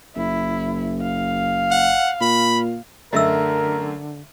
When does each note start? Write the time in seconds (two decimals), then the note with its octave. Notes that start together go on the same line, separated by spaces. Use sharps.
0.16 F#1 E4
1.02 F5
1.71 F#5
2.21 A#2 B5
3.13 F#2 D3 A3 A#4 D#5 E5 E6